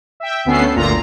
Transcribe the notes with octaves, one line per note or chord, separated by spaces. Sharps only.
E5 G5
D2 B3 C#4 A4 C7
G1 D2 A#2 F4 A#5